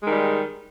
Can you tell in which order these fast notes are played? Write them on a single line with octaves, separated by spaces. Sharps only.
G#3 D#3 G3